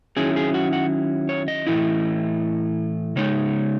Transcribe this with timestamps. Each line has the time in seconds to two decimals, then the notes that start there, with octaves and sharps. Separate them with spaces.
0.17 D#3 F#3 C#4 E4 G#4
0.36 G#4
0.54 F#4
0.73 F#4
1.29 C#5
1.48 D#5
1.67 A2 E3 A3 E4
3.16 C#3 G#3 D#4 C#5